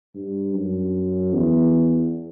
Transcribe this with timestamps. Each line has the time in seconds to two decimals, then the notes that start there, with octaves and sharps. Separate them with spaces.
0.15 G2
0.54 F#2
1.33 E2